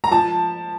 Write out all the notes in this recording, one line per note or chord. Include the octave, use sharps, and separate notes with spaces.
A#5
F3 A5